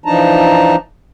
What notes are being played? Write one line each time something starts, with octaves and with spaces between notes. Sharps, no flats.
E3 F3 D4 D#4 A5 A#5